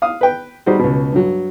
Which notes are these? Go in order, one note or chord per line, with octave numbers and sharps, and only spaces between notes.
F5 D#6
B4 G5
G3 D#4 F#4 G#4 C5
C#2 B2
G2 F#3